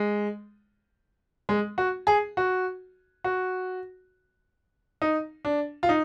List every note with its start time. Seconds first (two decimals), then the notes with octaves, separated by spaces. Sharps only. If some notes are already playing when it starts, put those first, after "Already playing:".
Already playing: G#3
1.49 G#3
1.78 F#4
2.07 G#4
2.37 F#4
3.24 F#4
5.02 D#4
5.45 D4
5.83 F4
5.89 D#4